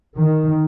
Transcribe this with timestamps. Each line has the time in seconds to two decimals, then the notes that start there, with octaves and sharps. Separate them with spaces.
0.16 D#3